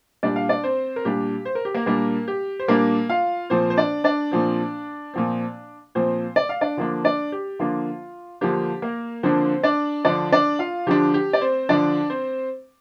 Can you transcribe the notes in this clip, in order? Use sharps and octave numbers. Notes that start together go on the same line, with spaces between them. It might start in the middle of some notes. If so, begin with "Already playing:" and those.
A#2 G3 D4 D5
F5
D4 D5
C4 C5
A#4
A#2 G3 D4 G4
C5
A#4
G4
A#3 A#4
A#2 G3 A#3 D4 A#4
G4
C5
A#2 G3 A#3 D4 A#4
F4 F5
A#2 F3 C4 C5
C5
D4 D5
D4 D5
A#2 F3 C4
A#2 F3 C4
A#2 F3 C4 C5
D5
F5
D4 D5
D3 F3 A#3 D4
D4 D5
G4
D3 F3 A#3 D4 F4
D3 F3 A#3 D4 G4
A#3 A#4
D3 F3 A#3 C4 D4 C5
D4 D5
D3 F3 D4 D5
D4 D5
F4 F5
D3 F3 D4 G4
G4
D5
C4 C5
D3 F3 D4 D5
C4 C5